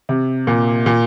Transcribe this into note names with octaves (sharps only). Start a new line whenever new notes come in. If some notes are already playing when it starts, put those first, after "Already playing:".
C3
A#2
A#2